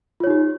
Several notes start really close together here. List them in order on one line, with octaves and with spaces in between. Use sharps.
F4 C#5 D#4 G4